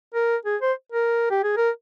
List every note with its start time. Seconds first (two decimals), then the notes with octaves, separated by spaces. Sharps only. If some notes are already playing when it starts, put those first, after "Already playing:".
0.14 A#4
0.46 G#4
0.62 C5
0.92 A#4
1.31 G4
1.43 G#4
1.57 A#4